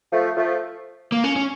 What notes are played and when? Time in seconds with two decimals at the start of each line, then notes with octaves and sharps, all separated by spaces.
0.12 F3 A3
0.37 F3 A3
1.12 A#3
1.24 C#4
1.36 C#4